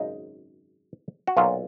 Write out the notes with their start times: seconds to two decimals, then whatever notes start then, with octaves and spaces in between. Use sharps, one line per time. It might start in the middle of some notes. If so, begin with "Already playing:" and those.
Already playing: G#1 F#2 C#3 G#3 D#4
1.27 F#4
1.37 B1 A#2 F#3 F4